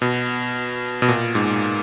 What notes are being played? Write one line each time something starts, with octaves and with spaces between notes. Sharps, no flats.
B2
B2
A#2
G#2